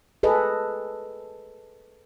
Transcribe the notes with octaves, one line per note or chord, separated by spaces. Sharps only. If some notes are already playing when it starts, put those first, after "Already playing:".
G#4 A4 B4 D#5